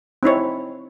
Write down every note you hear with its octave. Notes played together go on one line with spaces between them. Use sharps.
C4 D#4 E4 C#5